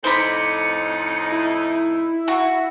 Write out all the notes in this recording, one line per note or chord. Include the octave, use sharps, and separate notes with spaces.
F2 A2 D#4 C5 D5 B5 C#7
E4
F#4